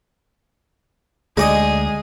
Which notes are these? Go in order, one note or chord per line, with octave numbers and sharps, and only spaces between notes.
D2 G#3 D#4 G#4 D5 D#5